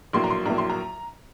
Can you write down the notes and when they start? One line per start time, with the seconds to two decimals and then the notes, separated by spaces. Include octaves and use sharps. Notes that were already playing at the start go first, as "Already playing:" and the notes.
0.13 A#1 A2 F#3 A#3 C6
0.24 A#5
0.30 C6
0.46 A#1 A2 F#3 A#3 A#5
0.58 C6
0.70 A#5